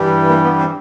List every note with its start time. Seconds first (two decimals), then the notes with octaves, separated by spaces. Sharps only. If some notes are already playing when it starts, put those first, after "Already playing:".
Already playing: G2 E3 G3
0.29 A#3
0.44 B3
0.59 C4